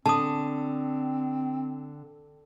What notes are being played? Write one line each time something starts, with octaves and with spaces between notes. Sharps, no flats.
D3 C4 A5 D#6